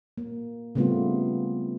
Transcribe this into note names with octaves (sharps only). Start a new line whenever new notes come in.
A#3
C#3 G3 A3 B3 C4 F4